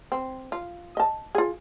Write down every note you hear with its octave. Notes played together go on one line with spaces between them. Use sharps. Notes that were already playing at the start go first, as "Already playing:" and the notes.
C4
F4
D#5 A5
F4 G#4